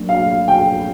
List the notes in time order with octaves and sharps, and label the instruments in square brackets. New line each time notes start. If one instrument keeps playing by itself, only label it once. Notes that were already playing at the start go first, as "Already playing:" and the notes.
Already playing: [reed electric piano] F#3 A#3 D4
[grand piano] F5
G5